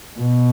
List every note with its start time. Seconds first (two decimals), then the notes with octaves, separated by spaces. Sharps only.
0.20 B2